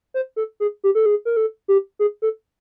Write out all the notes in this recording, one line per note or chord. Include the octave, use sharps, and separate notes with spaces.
C5
A4
G#4
G4
A4
G#4
A#4
A4
G4
G#4
A4